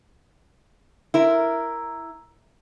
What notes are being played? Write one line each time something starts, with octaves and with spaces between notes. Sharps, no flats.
E4 A#4